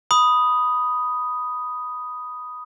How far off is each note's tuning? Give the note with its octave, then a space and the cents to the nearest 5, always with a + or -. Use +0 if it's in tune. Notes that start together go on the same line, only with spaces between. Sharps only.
B5 +0 D#6 +0